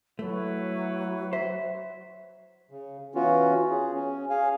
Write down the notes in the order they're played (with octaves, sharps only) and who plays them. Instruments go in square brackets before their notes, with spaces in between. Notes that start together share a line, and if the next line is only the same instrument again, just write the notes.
[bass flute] F#3 [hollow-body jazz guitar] A3 [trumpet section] E4 B4 C#5
[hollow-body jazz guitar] C5 [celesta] E5 B6
[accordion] C#3
E3 B3 C#4 F4 F#4
G#4
C#4
G#4 F5 G#5